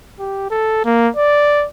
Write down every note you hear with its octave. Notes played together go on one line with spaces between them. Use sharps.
G4
A4
A#3
D5